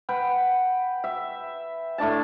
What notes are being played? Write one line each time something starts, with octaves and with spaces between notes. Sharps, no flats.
B4 F#5 G5
E5
A2 A3 D4 A5